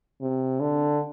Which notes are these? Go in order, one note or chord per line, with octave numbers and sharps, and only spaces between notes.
C3
D3